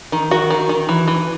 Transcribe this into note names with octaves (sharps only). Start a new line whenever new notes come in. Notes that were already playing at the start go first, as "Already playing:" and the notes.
D#3
D#3 F#4
D#3
D#3
E3
E3